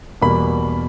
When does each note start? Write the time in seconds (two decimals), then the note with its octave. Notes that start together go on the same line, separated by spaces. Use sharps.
0.22 E2 B2 G3 A#3 B5